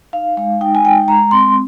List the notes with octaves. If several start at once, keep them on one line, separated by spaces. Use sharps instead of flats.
D#4 F5
G#3 F5
D#4 G5
G#5
G#3 G5
G#3 A#5
C4 C6